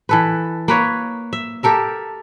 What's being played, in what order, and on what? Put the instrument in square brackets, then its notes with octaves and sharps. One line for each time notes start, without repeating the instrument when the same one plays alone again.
[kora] E3 A4 B4
A#3 B4 C#5
E5
G4 A4 A#4 E5